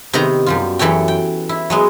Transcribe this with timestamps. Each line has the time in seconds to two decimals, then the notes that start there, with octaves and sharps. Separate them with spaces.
0.13 C3 D#3 B3 A#5
0.46 F#2 G3 F4
0.79 F#2 E3 A4 C#5 G5
1.08 G5
1.49 E4
1.70 F#3 G#3 B3